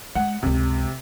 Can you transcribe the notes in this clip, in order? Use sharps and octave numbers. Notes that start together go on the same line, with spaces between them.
G#3 F#5
C#2 F#2 C3